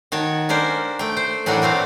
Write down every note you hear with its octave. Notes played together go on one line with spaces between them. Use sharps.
D#3 F#4 C#5 A5
C#4 D4 A#4 C5
A3 G5
C5
A2 E3 F#3 D4 F#4 A#4
A#2 A3 C4 F5